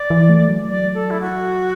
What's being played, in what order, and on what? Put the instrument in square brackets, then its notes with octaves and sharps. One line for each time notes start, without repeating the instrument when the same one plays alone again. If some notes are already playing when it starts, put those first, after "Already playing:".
Already playing: [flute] D5
[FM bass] E3
A3
F#3
[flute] D5
A4
E4
F#4